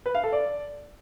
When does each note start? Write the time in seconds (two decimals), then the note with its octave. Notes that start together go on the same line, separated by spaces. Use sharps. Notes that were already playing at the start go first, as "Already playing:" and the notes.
0.06 B4
0.15 F5
0.24 A4
0.33 D5